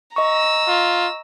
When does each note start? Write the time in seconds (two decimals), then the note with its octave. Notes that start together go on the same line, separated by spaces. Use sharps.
0.16 D#5 A#5 C#6 E6
0.68 F4